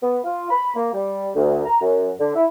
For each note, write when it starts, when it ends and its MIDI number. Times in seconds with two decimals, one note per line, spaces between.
0.03 0.18 59
0.24 0.46 65
0.51 0.70 83
0.76 0.88 58
0.93 1.30 55
1.35 1.61 38
1.65 1.76 82
1.81 2.10 42
2.19 2.34 50
2.35 2.45 64